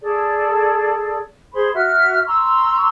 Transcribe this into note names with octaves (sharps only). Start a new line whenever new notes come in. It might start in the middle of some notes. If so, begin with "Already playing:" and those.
G#4 A4 D5
G#4 C5 B5 C6
F#4 E5 F6
A#5 C6 C#6 E6